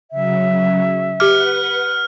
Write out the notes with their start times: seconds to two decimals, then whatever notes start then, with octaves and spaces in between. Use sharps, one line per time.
0.11 C#3 F#3 E5
1.20 G4 B4 F#5 D6 F6